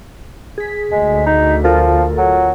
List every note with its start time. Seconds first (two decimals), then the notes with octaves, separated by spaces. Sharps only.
0.58 G#4 B6
0.92 D2 G#3
1.26 D#4
1.64 F3 F4 A4 A#4
2.18 F#3